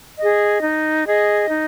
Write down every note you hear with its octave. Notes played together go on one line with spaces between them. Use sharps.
G#4 D#5
D#4
G#4 D#5
D#4